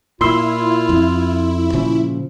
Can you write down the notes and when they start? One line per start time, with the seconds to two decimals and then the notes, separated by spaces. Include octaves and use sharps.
0.21 A#2 E4 F4 B5 C6 E6
0.89 F2
1.73 A#2 C#3 F3